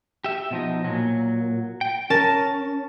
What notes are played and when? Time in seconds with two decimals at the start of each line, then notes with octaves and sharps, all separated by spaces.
0.24 G4 E5
0.51 B2 F3 D#4
0.85 A#2 F#3
1.81 G5
2.10 C#4 A#4 A5